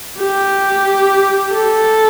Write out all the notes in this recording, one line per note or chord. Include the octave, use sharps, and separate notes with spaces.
G4
A4